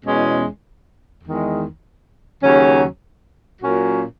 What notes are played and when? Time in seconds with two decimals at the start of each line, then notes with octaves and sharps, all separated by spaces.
0.03 E2 B2 G#3 C#4 G#4
1.22 E2 D#3 G#3
2.42 D#2 C#3 F#3 C#4
3.61 A#2 F#3 C#4 F#4 A#4